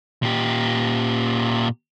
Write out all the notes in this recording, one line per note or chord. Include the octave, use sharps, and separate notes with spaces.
A#2 G4